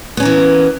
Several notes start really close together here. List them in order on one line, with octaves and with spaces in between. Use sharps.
B3 C#4 A#4 E3